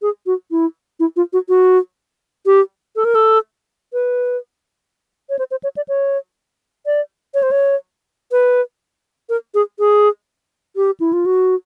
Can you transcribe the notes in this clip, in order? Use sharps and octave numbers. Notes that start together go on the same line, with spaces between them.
G#4
F#4
E4
E4
F4
F#4
F#4
G4
A4
A#4
A4
B4
C#5
C5
C5
C#5
D5
C#5
D5
C#5
C5
C#5
B4
A#4
G#4
G#4
G4
E4
F4
F#4